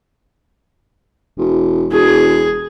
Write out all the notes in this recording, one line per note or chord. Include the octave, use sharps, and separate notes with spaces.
E1
E1 G#4